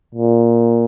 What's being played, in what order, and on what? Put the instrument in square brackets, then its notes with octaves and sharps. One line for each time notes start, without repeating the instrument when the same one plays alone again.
[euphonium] A#2